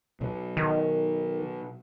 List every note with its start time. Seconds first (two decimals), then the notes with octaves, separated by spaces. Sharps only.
0.21 B2 F#3 B3
0.57 D#3